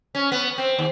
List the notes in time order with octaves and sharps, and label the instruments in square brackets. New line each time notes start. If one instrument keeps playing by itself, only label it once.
[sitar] C#4
B3
C4
D#2